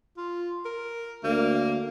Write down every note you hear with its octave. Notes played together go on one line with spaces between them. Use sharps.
F4
A#4
D2 A#3